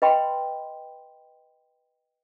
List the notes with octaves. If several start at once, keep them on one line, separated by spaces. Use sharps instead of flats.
B4 D#5 G5 B5 C6